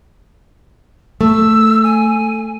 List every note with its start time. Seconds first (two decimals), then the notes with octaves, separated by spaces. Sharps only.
1.21 A3 E6
1.83 G#5